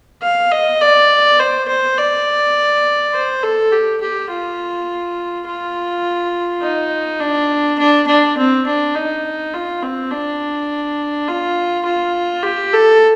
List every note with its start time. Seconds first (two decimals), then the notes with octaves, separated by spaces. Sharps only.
0.22 F5
0.52 D#5
0.81 D5
1.40 C5
1.68 C5
1.98 D5
3.14 C5
3.43 A4
3.72 G4
4.01 G4
4.30 F4
5.47 F4
6.62 D#4
7.20 D4
7.79 D4
8.07 D4
8.37 C4
8.67 D4
8.95 D#4
9.53 F4
9.82 C4
10.11 D4
11.28 F4
11.85 F4
12.43 G4
12.73 A4